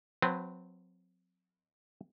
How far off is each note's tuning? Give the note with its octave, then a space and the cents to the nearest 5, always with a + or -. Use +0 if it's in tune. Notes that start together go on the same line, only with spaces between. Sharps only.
F#3 -35 C4 -20 B4 +0